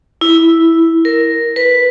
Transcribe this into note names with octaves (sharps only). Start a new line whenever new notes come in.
E4
A#4
B4